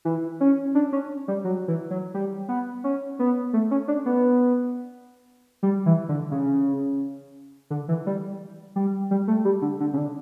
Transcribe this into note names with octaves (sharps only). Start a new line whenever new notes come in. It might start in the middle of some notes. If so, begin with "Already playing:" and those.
E3
C#4
D4
C#4
G3
F#3
E3
F#3
G3
B3
C#4
B3
A3
C#4
D4
B3
G3
E3
D3
C#3
D3
E3
G3
G3
G3
A3
G3
D3
D3
C#3
D3